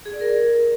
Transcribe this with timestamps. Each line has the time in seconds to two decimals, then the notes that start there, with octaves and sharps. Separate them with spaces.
0.06 G#4
0.13 D5
0.21 A#4